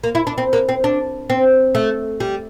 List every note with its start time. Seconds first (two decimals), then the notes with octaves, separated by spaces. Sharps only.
0.04 A#3
0.15 E4
0.27 D4
0.38 C4
0.53 A#3
0.69 C4
0.84 D4
1.30 C4
1.75 A3
2.20 G3